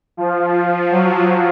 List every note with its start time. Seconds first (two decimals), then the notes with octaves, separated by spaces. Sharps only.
0.17 F3
0.91 F#3